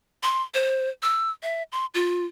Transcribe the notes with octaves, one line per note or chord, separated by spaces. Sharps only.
C6
C5
E6
E5
C6
F4